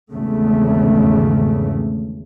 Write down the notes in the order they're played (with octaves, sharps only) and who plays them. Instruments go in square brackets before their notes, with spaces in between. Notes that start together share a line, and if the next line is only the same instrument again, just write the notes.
[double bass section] G#1 E2 C#3 A3